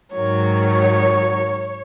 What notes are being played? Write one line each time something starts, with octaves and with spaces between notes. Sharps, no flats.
G#2 D#3 F#3 C#5